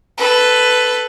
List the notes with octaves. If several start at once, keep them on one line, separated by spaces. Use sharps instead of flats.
A4 B4